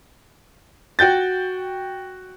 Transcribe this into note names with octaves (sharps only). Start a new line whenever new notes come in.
F#4 G5 G6 A6